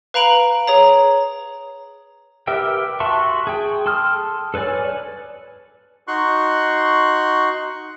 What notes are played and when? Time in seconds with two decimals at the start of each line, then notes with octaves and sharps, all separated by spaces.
0.14 B4 F5 A#5 B5 D7 F#7
0.67 G#4 C#5 A#5
2.47 G4 A#4 B4 E5 G5
3.00 F#4 E5 A5 C6 C#6
3.47 G#4 G5
3.86 A4 C6 D#6 F6
4.54 A4 B4 C#5 D5 G#5
6.08 D#4 F#4 C6 C#6 F#6